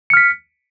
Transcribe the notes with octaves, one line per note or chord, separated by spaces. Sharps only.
F6 B6 C#7